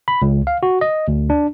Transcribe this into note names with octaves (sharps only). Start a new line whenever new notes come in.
B5
C#2
F5
F#4
D#5
D2
D4